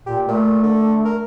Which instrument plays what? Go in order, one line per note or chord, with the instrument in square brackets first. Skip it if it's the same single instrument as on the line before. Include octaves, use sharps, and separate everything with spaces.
[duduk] A#2 [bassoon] G4
[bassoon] A#2 [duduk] A3
[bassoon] D3
A#4